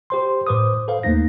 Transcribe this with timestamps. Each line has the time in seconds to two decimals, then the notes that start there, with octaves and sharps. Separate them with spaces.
0.10 G4 C5 C6
0.47 A2 B4 C5 D6 D#6
0.88 A4 B4 C5 F5
1.03 D#2 A3 A#3 D#4 A#6